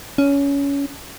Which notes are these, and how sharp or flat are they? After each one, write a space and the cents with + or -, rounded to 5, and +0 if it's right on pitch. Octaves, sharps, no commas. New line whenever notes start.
C#4 +20